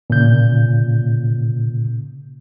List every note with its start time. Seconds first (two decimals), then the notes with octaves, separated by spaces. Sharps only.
0.10 A#2 C#3 G6